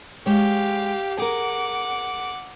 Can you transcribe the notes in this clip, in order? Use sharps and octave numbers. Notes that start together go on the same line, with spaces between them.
G#3 G4 C#5 F5
G#4 A#4 F#5 D6